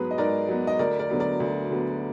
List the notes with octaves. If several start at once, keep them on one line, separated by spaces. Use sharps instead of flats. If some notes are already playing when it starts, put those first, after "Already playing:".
Already playing: G#2 F#3 B3 G#4 B4
D#5
G#2 A#4 D5
F#3 B3
D#5
D2 A#4 D5
A#4 D5
D3 F#3 B3
A#4 D5
D2
D3 F#3 B3